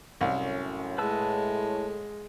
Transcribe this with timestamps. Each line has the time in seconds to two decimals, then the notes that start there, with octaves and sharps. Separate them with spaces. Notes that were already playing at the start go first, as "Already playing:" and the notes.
0.21 C2 F#2 A2 C#4
0.98 A2 G#3 B4 A5 E6